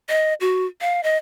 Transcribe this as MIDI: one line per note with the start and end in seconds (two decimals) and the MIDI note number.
0.09 0.34 75
0.41 0.66 66
0.81 1.03 77
1.03 1.17 75